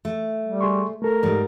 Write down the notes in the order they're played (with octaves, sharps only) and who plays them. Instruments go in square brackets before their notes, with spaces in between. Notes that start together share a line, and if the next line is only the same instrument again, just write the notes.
[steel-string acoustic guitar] A3
[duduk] G3
[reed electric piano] G#4 C6 C#6
[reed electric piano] A3 A4 [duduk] A#4
[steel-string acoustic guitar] G#2 G3